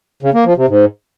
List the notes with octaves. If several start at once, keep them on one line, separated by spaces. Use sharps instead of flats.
C#3
A#3
F3
C3
G#2